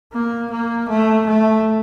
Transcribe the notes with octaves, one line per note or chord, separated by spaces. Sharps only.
A#3
A#3
A3
A3